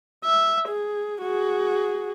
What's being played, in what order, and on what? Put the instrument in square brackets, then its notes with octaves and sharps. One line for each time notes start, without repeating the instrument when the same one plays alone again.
[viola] E5
G#4
F#4 G#4